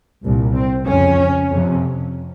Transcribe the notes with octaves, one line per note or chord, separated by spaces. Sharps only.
C2 A#2
C4
F2 C#3 C#4
F2 C3